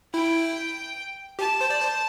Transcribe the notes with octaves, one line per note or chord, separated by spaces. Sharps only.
E4 G5
G4 A5
C5
D5
C5